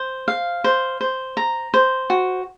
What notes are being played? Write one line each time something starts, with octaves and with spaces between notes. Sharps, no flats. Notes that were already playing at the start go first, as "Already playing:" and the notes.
Already playing: C5
F5
C5
C5
A#5
C5
F#4